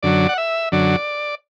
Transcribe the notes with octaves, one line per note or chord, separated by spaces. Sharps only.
F#2 D3 F#3 D5
F#5
E5
F#2 D3 F#3 D5